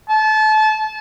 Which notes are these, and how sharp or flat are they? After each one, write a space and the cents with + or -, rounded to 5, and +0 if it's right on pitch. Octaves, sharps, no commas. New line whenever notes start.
A5 -30